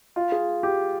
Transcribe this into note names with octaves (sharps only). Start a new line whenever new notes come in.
F4
G#4
G4